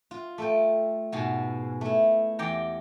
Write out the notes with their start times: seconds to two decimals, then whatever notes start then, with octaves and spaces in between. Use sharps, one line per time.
0.11 F4
0.38 A3 A4 G5
1.12 G#2 B2 B3
1.81 A3 E4
2.39 E2 G4 G5 A#5